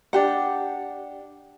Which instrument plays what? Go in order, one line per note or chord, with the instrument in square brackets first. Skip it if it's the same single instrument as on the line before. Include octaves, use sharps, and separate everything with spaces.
[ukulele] D4 G4 F#5